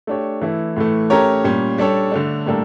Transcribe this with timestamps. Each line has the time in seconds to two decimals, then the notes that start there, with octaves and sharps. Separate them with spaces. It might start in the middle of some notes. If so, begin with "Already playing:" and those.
0.07 A3 D4 G4 C#5
0.41 E3 A3 E4
0.76 A2 E3 A3
1.10 A3 C#4 G4 A#4 C#5
1.44 A#2 G3 C#4
1.78 G3 D4 A4 C#5
2.12 D3 A3 D4
2.46 A2 G3 A#3 D4 A4